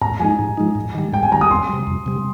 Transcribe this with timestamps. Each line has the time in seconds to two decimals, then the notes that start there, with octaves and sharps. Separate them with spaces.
0.02 G#2 A#5
0.20 F3 G#3 D#4 G#5
0.39 G#2
0.57 F3 G#3 D#4
0.75 G#2
0.95 D#3 G3
1.13 G#2 G5
1.23 G#5
1.32 D#3 G3 A#5
1.41 D#6
1.51 F2 C6
1.69 C3 G3
1.87 F2
2.06 C3 G3